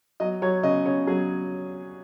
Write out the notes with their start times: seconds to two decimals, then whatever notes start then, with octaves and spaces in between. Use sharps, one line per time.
0.20 F#3 D#5
0.42 F#3 C#5
0.63 C#3 D#5
0.85 C#3 C#5
1.07 F#3 G#4